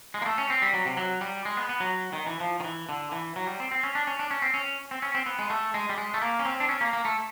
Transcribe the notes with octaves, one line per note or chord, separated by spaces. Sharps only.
G#3
A#3
A3
C#4
C4
G3
F#3
C3
F#3
G3
G#3
B3
B3
F#3
D#3
E3
F3
D#3
E3
D3
E3
F#3
G3
C4
C4
C#4
D4
C#4
D4
C#4
C4
C#4
C4
C#4
C4
B3
G#3
A3
G#3
G3
G#3
A3
A#3
C#4
C4
D4
C#4
A#3
A#3
A3